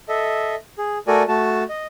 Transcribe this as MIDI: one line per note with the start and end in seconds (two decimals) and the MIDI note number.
0.09 0.55 69
0.09 0.55 75
0.09 0.55 76
0.78 0.98 68
1.07 1.23 57
1.07 1.23 66
1.07 1.23 69
1.07 1.23 70
1.07 1.23 74
1.07 1.23 80
1.28 1.64 57
1.28 1.64 66
1.28 1.64 81
1.69 1.87 75